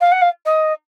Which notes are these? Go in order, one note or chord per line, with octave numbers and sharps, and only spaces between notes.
F5
F#5
F5
D#5